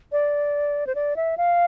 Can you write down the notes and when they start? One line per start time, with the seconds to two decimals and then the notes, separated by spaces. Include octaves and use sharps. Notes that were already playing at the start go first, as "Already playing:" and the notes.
0.12 D5
0.87 C5
0.95 D5
1.16 E5
1.38 F5